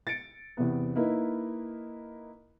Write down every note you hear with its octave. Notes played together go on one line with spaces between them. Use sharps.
A6 C#7 D7
E2 C3 B3
A#3 D#4 E4 A#4 B4